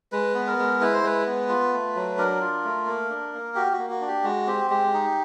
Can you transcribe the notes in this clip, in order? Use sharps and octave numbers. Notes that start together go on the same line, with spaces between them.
G#3 B4
B3
A#4
G#3
E4 B4
C5
G#3 B4
B3
F4
A3
F#3
D4 A#4
F4
A3
A#3
D4
A#3
F#4 G4
F#4
A#3
F#4
D4
G4
G#3 F#4
C4 G4
G#3 G4
D#4